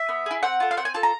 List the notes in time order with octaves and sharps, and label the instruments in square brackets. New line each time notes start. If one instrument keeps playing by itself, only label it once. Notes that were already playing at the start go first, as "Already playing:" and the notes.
Already playing: [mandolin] E5
B3
E4 G#4
C4 F#5
F4 A4
F5
C4 F#5
G#5
F4 A4 A5
A#5